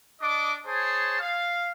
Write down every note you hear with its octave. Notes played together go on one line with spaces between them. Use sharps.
D4 D#5 D6
G#4 C5 C#5 A5
F5